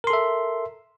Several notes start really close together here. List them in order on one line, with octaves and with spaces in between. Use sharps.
A#4 C6 A4 E5